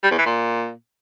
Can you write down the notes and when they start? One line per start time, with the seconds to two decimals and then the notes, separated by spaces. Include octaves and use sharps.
0.03 G3
0.11 E2
0.18 E3
0.26 A#2